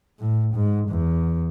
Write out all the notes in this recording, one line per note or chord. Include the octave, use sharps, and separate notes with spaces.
A2
G#2
E2